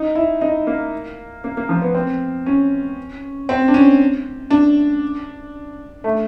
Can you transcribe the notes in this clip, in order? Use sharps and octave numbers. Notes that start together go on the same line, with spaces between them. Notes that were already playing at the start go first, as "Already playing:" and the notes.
Already playing: D#4
E4
D#4
A#3
A#3
A#3
F3
B3
C4
C#4
C4
D4
C#4
D4
A3